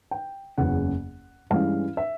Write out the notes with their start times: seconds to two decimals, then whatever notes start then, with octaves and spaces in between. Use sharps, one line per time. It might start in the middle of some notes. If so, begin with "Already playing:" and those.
0.11 G5
0.58 F#1 E2 C#3 F#5
1.50 G2 E3 G#3 C#4 F5
1.97 E5